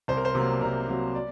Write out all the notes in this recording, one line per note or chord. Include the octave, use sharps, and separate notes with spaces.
C2 C5
A#4
C5
C3 F#3 A#3
C2 A#4
C3 F#3 A#3
D5